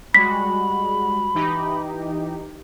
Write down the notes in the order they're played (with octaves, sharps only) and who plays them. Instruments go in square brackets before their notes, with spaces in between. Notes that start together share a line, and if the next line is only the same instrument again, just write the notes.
[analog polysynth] G3 G#3 F#4 [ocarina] B5 [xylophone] B6
[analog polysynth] E3 D#4 G4